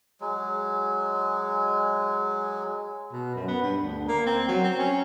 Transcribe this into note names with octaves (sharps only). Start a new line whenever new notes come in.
F#3 G#3
B2
F#2
B3
G2
D2
A#3
C4
F#3
C4
C#4